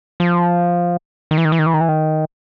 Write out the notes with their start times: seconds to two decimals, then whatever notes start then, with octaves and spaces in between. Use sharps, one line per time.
0.20 F3
1.31 D#3
1.38 E3
1.45 D#3
1.52 E3
1.59 D#3
1.66 E3
1.74 D#3
1.80 E3
1.89 D#3